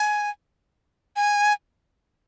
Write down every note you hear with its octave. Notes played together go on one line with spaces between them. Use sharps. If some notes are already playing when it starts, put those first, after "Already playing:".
Already playing: G#5
G#5